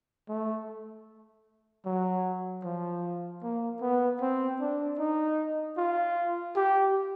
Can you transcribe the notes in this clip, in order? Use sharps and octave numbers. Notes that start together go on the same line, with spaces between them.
A3
F#3
F3
A#3
B3
C4
D4
D#4
F4
G4